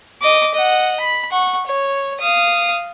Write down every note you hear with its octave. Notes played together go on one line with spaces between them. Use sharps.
D#5 D6
D#5 F#5
B5
F#5 C#6
C#5
F5 D#6